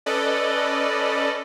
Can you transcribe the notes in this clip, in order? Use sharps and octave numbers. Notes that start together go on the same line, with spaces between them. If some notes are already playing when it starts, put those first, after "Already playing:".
C#4 A4 B4 D5 D#5